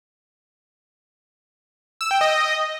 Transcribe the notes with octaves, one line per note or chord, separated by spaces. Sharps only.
E6
G5
D#5